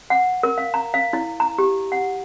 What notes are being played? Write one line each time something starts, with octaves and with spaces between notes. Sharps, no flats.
F#5
A#4
F5
A#5
F5
E4
A#5
G4
F#5